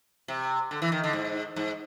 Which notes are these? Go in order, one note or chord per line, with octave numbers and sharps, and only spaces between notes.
C3
D3
E3
D#3
D3
G#2
G#2